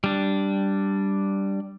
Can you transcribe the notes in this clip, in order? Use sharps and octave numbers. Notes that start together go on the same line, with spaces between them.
G3 D4